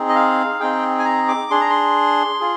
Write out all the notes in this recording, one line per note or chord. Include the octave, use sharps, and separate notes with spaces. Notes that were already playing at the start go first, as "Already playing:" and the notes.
Already playing: C4 D#4 G#4
D#5
F5
C4 D#4 G#4 G5
G#5
A#5
D6
D4 G#4 C6
A#5
C6
F4 G#4